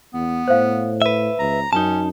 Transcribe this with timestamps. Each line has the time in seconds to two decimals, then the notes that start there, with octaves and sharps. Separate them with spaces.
0.14 E2 B3
0.48 A2 C5 F5
1.02 B4 E5
1.39 C#2 A#5
1.73 F#2 C#4 D#4 A5